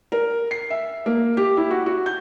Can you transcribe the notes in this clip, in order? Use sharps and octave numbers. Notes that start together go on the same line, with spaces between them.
A#4
C7
E5
A#3
G4
E4
F#4
F#4
G6